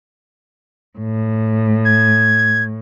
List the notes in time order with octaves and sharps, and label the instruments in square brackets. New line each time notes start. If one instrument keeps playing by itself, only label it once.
[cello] A2
[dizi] G#6